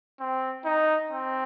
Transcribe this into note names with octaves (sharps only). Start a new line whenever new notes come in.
C4
D#4
C4